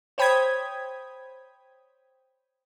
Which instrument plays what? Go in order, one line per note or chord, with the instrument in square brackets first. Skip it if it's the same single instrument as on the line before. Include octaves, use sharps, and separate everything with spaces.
[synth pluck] C5 C#5 G5 B5 D#6 G#6